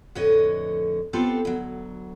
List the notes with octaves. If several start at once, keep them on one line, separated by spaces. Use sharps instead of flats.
F2 A2 D3 B4 C#5 D#5
B3 C4 F4 G4 A4
D2 F#3